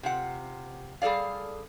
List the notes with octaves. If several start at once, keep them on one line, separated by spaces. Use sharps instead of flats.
C3 F4 F#5
G3 G#4 A4 D5 F5